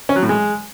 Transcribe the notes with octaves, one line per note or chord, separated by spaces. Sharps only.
C#4
F#3
A2
G#3